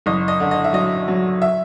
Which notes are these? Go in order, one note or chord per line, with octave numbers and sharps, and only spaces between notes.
F#1 D#5
D#5
D3
D#5
E5
F#3 D#5
F#3
E5